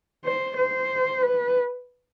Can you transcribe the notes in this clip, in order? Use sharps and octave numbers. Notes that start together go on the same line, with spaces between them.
C5
C5
B4